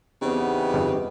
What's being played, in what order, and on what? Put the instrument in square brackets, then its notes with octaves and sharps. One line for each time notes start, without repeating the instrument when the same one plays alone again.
[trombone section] E2 B3 [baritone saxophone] C#3 [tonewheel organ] C4 D#4 G4
[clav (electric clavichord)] G1 F2